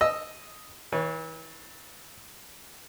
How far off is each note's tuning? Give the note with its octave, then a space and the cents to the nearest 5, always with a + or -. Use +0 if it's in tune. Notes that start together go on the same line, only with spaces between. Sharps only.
D#5 +0 E6 +0
E3 -35 C#5 +0